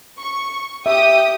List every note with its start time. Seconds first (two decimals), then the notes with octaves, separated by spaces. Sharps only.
0.20 C#6
0.86 G4 E5 G5 D#6